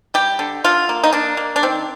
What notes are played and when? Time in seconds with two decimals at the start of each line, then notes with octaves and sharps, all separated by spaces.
0.14 G3 G4
0.39 D3
0.64 D3 F4
0.89 A#3
1.03 D#4
1.13 A#3 D4
1.37 A#3
1.56 D4
1.63 D#3 C4